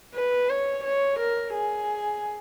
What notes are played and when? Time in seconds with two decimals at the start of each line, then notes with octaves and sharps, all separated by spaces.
0.15 B4
0.50 C#5
0.85 C#5
1.19 A#4
1.54 G#4